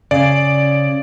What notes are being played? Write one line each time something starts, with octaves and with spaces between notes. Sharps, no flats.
C#3 D5